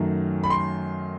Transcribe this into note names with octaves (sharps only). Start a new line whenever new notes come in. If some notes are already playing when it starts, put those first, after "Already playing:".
Already playing: F#2 D#3 F#3 A3
B5
C6